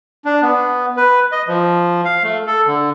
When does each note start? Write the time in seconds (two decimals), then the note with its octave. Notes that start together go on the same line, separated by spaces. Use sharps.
0.25 D4
0.42 B3
0.97 B4
1.32 D#5
1.48 F3
2.05 F5
2.24 A3
2.47 A4
2.67 D3